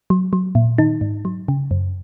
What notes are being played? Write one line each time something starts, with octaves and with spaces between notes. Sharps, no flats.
F#3
F#3
A#2
D#3 D#4
G#2
F#3
C#3
F#2